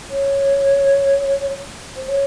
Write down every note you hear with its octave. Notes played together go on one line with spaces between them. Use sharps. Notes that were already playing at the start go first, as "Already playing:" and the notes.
C#5
C5
C#5